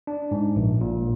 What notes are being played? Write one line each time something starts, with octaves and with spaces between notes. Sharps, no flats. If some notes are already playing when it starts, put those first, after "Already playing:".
D4
G#2
A#1
A#2